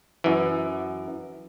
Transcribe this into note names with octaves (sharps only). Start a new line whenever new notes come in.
F#2 E3